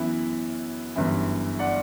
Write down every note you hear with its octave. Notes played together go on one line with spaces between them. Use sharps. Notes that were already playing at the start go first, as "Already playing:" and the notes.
Already playing: F#2 E3 B3 E4
G1 F#2 E3
D5 F#5